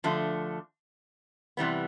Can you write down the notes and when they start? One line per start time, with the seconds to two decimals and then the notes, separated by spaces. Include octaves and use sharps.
0.04 D3 F3 A3
1.57 C3 E3 G3 B3